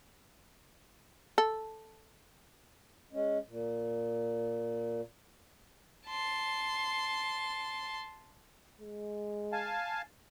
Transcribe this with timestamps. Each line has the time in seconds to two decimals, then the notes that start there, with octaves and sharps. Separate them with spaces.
1.38 A4
3.13 G#3 C#4
3.49 A#2
6.07 A5 C6
8.81 G#3
9.53 F5 G#5 A5